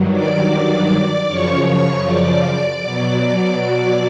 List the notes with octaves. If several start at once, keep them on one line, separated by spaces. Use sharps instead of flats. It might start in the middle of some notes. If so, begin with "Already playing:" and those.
Already playing: G2 D#3 F#3
D5 D6
F#2 C#3 F3 C#5 C#6
D5 D6
B2 F#3